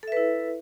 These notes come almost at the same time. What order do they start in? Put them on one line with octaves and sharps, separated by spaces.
A4 E5 B4 E4